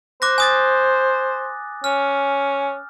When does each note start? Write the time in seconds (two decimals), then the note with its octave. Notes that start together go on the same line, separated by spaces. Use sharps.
0.22 C5 D6 F#6 A#6
0.38 G#5 D#6 A6
1.84 C#4 F6